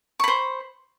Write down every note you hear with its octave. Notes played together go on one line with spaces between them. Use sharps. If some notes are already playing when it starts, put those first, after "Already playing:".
C5 B5 C#6